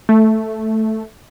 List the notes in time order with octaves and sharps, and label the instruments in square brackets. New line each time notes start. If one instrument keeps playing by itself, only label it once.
[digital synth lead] A3